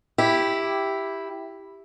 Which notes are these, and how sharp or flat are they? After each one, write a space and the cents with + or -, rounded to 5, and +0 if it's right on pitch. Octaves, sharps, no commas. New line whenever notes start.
E4 +0 G4 +0